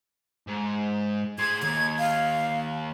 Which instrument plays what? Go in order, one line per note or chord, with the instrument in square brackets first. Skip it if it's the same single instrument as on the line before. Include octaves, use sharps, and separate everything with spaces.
[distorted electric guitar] G#2
[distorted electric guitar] G#4 C5 [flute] G#6
[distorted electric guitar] D#2 [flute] G#6
[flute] F5